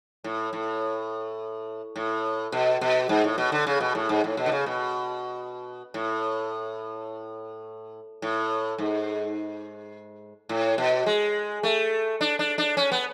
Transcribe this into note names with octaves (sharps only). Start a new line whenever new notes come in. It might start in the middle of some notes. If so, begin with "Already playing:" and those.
A2
A2
A2
B2
B2
G#2
A2
B2
D3
C#3
B2
A2
G#2
A2
B2
D3
C#3
B2
A2
A2
G#2
A2
B2
G#3
A3
D4
D4
D4
C#4
B3